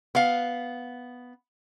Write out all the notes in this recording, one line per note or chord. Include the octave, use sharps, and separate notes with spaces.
B3 F5